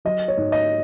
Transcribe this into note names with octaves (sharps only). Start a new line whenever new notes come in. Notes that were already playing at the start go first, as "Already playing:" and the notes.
F#3 D#5
C#5
G#2
D#5